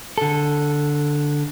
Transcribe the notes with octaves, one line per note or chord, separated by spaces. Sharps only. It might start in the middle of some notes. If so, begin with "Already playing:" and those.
D3 A4